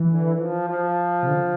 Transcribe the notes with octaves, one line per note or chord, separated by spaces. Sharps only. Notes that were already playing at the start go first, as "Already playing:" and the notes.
Already playing: E3
D3
F3
F3
C3
D3